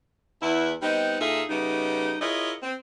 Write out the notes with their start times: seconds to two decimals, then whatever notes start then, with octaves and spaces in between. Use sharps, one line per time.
0.42 E2 E4
0.82 G3 B3 C4 D#4
1.20 A#2 D#4 F4 G#4 A4 E5
1.50 C#3 G3 A3 B3 D#4
2.21 E4 F4 G#4 A#4 C#5 D#5
2.63 C4